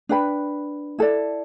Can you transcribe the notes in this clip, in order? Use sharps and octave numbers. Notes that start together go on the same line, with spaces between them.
D4 B4 G5 B5
E4 A4 D5